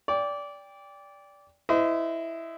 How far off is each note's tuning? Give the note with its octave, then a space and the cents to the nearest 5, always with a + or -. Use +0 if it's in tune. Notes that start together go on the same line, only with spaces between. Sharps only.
D5 -20 G5 +20
E4 +0 C5 -40 D#5 +0